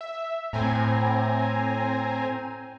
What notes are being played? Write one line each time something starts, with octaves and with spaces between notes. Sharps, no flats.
E5
A2 C4 G#5 A#5